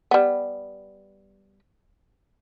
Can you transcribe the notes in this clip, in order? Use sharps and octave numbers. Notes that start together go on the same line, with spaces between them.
G3 B3